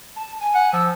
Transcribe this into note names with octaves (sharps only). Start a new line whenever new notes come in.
A5
G#5
F#5
F3 E6